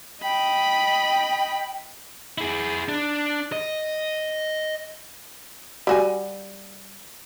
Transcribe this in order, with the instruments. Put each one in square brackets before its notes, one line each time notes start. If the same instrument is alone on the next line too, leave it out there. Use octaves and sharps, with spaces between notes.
[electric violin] D#5 B5 [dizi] G5
[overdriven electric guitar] E4 G#4
D4
D#5
[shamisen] G3 F#4 G#5